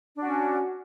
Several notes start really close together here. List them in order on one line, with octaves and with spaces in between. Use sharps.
D4 F#4 C#4